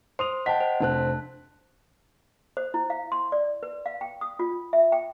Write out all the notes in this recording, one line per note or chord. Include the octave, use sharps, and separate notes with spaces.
C5 C6 D#6 F7
D#5 F#5 G5 A5 B6
C5
F1 C4 D4 A5 F#6
C5
E4
F5
C6
D5
B4
F5
G5
D#6
F4
E5
G5